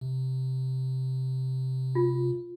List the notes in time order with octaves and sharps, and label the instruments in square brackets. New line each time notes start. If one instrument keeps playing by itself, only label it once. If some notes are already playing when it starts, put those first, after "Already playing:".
[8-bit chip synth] C3
[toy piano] F4